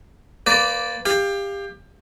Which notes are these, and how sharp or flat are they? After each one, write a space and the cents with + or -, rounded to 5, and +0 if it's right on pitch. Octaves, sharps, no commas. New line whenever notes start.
A#3 +0 B4 +30 D5 -5
G4 +25 F5 +0